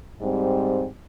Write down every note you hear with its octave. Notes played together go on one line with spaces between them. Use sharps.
G#2 G3 C4